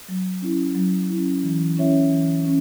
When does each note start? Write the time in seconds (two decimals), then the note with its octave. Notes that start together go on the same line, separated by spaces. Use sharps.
0.09 F#3
0.42 C#4 E4
0.75 F#3
1.09 C#4 E4
1.43 E3
1.77 C#4 E4 C#5 E5
2.11 E3
2.45 C#4